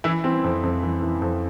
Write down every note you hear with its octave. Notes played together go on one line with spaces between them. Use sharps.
E3 E4
E3 C4
F2
F2
E3
E3
F2